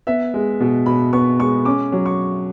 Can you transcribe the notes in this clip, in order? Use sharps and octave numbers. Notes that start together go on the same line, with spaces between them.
B3 E5
G#3
B2
B2 B5
B3 C#6
G#3 C#6
C#4 D6
F#3
C#6